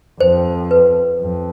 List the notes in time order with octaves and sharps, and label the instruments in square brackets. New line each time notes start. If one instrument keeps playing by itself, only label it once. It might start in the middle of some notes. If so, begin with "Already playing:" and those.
[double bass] F2 [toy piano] C5
[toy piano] B4
[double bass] F2